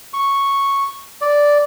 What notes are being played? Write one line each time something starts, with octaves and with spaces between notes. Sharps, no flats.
C#6
D5